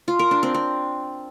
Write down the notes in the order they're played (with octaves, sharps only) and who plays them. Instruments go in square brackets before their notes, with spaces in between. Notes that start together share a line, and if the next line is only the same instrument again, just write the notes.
[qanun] F4
A#4
D4
C4
C4